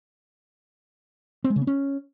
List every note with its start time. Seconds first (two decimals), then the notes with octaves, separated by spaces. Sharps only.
1.44 C4
1.50 G#3
1.56 C#3
1.62 B3
1.67 C#4